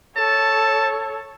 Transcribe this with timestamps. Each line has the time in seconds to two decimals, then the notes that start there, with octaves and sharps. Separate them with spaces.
0.17 A4 C#5 A5